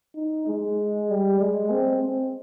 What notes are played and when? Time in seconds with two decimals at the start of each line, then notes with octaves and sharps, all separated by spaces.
0.15 D#4
0.47 G#3
1.10 G3
1.40 G#3
1.72 C4
2.02 C4